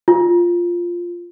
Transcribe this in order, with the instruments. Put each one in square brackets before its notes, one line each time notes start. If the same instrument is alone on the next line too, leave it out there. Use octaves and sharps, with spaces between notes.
[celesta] F4